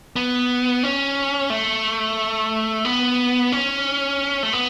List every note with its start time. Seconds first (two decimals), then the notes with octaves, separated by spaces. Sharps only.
0.16 B3
0.83 C#4
1.50 A3
2.85 B3
3.52 C#4
4.43 A3
4.53 B3